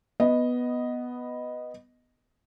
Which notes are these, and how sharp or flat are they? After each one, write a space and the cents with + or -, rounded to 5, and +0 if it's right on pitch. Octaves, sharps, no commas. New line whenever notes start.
B3 +0 D#5 +0